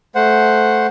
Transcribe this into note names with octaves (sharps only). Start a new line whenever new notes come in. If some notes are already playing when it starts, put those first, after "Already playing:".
A3 C5 F#5